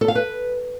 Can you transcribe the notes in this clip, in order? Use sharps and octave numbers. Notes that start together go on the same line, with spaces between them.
A4
F5
B4